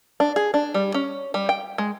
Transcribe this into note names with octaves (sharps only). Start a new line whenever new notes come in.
D4
G#4
D4
G3
C#4
G3
G5
G#3